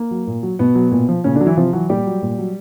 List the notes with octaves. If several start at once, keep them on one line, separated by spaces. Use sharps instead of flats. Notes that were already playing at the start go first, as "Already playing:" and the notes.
Already playing: A#3
F#3
A#2
F#3
B2 B3
F#3
A#2
F3
A#2 C#3 C#4
D3 D4
F#3
E3 E4
C3 F3 F4
E3 F#3 F#4
A#2 G3 G4
F#3
A#2
F#3